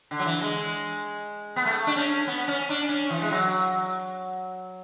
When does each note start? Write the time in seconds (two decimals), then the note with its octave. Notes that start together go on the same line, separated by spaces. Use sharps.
0.11 D3
0.19 F#3
0.26 E3
0.41 G#3
1.56 B3
1.65 A3
1.87 D4
1.96 C#4
2.27 B3
2.48 C#4
2.69 D4
2.89 C#4
3.10 E3
3.21 G#3
3.31 F#3